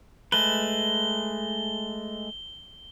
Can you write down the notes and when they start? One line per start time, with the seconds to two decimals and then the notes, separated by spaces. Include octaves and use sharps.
0.32 G#3 A3 B4 G7